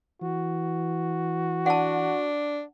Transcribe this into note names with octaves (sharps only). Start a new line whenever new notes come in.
E3 F#4
D4 F#5 A5